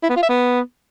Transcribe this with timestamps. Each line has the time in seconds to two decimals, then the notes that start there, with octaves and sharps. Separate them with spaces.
0.03 E4
0.10 B3
0.16 F4
0.23 E5
0.29 B3